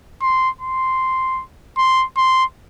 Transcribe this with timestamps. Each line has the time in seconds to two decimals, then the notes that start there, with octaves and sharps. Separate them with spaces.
0.22 C6
0.61 C6
1.78 C6
2.17 C6